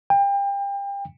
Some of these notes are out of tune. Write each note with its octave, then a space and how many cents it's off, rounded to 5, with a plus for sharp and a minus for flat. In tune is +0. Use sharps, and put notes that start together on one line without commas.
G5 +30